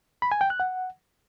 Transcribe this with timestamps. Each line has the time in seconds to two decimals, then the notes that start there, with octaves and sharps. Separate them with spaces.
0.22 B5
0.32 G#5
0.41 G5
0.50 F#6
0.60 F#5